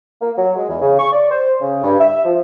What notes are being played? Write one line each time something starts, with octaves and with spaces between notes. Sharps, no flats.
A#3
F#3
G#3
E2
C#3
C#6
D5
C5
C#3
G2
E5
F3